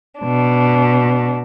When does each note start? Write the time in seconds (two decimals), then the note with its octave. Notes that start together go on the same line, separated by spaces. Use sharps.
0.21 B2 D4